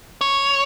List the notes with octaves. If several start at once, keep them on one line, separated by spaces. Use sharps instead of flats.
C#5